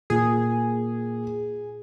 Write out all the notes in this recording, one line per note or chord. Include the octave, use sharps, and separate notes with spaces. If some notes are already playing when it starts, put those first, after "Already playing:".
A#2 G#4